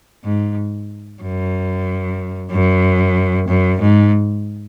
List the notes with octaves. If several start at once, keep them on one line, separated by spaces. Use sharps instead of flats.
G#2
F#2
F#2
F#2
G#2